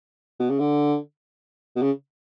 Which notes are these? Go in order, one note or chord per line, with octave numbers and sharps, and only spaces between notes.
B2
C#3
D3
B2
C#3